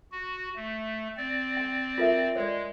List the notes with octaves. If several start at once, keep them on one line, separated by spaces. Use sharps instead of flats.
F#4
A3
C4 D5
G5
F4 A#4 E5
G#3 C#5 D5